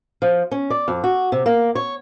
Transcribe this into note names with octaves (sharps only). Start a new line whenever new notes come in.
F3
C#4
D5
F2
F#4
C3
A#3
C#5